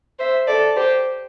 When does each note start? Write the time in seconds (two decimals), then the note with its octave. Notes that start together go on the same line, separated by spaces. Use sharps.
0.19 C5 E5
0.47 A4 D5
0.76 G4 C5